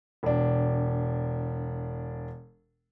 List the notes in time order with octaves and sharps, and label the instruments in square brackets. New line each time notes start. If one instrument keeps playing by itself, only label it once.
[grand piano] E1 D4